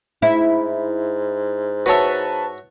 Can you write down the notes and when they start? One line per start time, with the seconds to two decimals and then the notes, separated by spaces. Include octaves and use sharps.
0.22 G#2 E4
1.86 F#4 B4 C#5 E5 A5